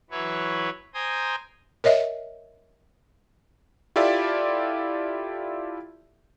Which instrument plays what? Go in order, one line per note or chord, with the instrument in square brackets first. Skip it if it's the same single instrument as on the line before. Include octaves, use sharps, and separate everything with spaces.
[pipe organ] E3 F#3 E4 B4 C#5
C5 G5 G#5 A#5 D#6
[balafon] A#4 C#5 D#5 E5
[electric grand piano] E4 F4 G4 A4 D5 E5